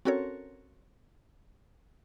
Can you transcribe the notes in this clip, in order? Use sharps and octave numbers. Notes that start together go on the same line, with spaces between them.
C4 C#4 F#4 A4 A#4 C#5